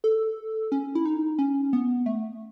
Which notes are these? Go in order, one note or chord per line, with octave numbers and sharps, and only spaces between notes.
A4
C#4
E4
D#4
C#4
B3
A3